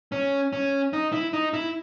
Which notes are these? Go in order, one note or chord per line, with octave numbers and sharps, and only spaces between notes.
C#4
C#4
D#4
E4
D#4
E4